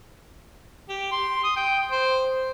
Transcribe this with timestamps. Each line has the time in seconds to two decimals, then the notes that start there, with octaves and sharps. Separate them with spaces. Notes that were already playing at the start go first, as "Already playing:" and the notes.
0.89 G4
1.12 C6
1.44 D#6
1.56 G5
1.91 C5